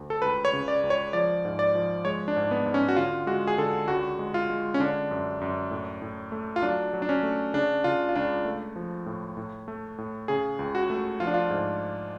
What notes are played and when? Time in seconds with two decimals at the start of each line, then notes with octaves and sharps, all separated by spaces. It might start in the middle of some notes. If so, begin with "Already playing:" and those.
Already playing: D2
0.10 A4
0.22 C#2 B4
0.45 C#5
0.53 C#3
0.68 D5
0.84 C#2
0.90 C#5
1.13 F3 D5
1.45 G#2
1.59 D5
1.75 F3
2.05 G#3 C#5
2.28 D4
2.36 G#2
2.51 B3
2.66 G#2
2.74 C#4
2.88 F#4
2.96 D3 F4
3.27 G#3 F#4
3.47 G#4
3.58 D3 A4
3.88 C#2 F#4
4.19 G#3
4.34 F4
4.50 G#3
4.74 C#4
4.80 D3 D4
5.11 F#2
5.41 F#2
5.71 A2
6.02 A2
6.32 A3
6.56 F4
6.62 F#3 D4
6.93 F#3
7.02 D4
7.09 C#4
7.23 A3
7.54 C#3 D4
7.84 C#3 F4
8.09 F4
8.15 C#2 D4
8.45 A3
8.76 F3
9.06 A2
9.37 A2
9.68 A3
9.98 A2
10.28 C#3 G#4
10.59 C#2
10.75 F#4
10.90 A3
11.20 F3 F4
11.27 D4
11.34 F4
11.50 G#2